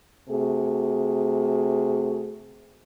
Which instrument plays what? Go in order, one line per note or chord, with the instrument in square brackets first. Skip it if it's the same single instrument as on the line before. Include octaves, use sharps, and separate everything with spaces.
[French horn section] C3 A3 F#4 G#4